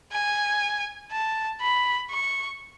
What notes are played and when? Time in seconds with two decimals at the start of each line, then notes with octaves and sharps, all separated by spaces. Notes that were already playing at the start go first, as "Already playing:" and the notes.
0.12 G#5
1.12 A5
1.61 B5
2.11 C#6